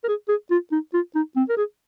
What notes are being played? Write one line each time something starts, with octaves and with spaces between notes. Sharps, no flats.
A#4
G#4
G#4
F4
D#4
F4
D#4
C4
A#4
G#4